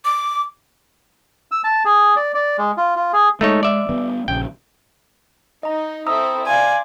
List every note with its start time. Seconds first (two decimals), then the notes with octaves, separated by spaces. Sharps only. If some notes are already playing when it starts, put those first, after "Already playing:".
0.05 D6
1.51 E6
1.64 A5
1.85 G#4
2.16 D5
2.35 D5
2.58 G#3
2.77 F4
2.96 F4
3.13 G#4
3.41 G#3 A3 D#4 C#5
3.63 D5 E5
3.89 G3 B3
4.28 A#1 C#3 G5
5.63 D#4 D#5 A#5
6.07 C4 E4 A4 C5 A#5 D#6 E6
6.47 D5 F5 G#5 C6